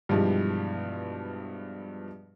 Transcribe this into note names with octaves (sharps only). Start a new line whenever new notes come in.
G2 B2 E3 F3 G3 G#3